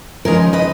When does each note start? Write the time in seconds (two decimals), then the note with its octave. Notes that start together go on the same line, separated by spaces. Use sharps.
0.25 D#2 C#3 F3 G#3 D#4 A#4 C#5
0.53 B4 D#5